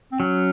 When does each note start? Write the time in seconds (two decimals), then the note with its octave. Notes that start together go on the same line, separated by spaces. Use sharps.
0.12 C4
0.20 F#3 C#4